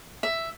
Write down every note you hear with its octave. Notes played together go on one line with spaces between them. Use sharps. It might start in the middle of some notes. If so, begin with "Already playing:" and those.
E5